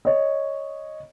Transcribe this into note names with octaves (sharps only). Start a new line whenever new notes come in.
C#5 D#5